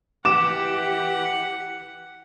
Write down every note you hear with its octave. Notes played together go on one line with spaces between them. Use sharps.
E3 G4 F#5 D6 E7